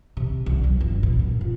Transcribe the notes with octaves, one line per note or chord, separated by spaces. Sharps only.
C3
C2
F#3
G1
A#2
F#2
F4